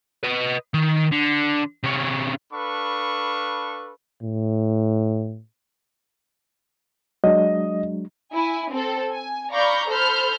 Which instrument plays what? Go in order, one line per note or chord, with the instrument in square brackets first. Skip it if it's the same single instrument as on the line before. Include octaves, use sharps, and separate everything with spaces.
[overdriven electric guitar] B4 D#5
D#3
D3
C3 C#4
[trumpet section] D4 A4 B4 F5 B5 C#6
[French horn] A2
[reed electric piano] F#3 G#3 D4 [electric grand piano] D#5
[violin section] E4 G#5
C4 A4
G#5
D5 F5 A#5 B5 C#6 G6
A4 C5 B5 F6 G6